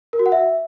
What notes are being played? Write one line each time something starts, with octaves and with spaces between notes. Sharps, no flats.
A#4
F#4
F#5
E5